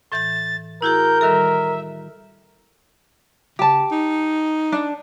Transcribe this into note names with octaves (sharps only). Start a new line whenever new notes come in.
A2 E3 G6 A6
E4 F#4 G#4 A#4 G6
D#3 G3 A4 E5
C#3 G4 A5
D#4
D4